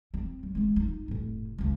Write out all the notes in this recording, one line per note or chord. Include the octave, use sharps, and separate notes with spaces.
C4
F#3
G#3 B3
D#4 F4
F1 A2
C#2 D#3